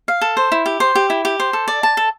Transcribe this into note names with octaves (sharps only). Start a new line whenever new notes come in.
F5
A4
C5
E4
G4
C5
G4
E4
G4
C5
A4
D5
A5
A4